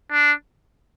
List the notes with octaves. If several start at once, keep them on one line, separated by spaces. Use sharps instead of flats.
D4